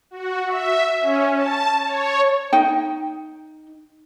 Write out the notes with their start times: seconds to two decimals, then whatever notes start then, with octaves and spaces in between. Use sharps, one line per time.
0.11 F#4
0.47 E5
1.00 C#4
1.35 A5
1.84 C#5
2.53 D#4 G5